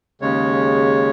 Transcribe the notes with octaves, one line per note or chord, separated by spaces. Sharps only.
D#2 C#3 G#3 C#5